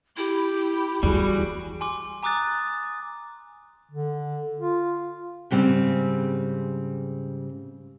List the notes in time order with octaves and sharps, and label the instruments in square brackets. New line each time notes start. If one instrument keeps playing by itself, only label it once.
[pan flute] E4 [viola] G4
[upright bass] E2 [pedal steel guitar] G3 [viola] F#4 G#4
[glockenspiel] G#5 C6 D6
G#5 A#5 D6 D#6 F#6 A6
[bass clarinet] D3
F4
[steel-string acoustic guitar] G#2 C#3 G3 C4